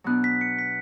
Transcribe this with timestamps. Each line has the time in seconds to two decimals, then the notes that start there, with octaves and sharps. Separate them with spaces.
0.04 B2 F#3 B3 D4 F#6
0.24 B6
0.41 C#7
0.59 B6